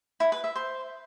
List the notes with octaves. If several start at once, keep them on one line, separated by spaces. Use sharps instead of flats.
E4
B4
E5
C5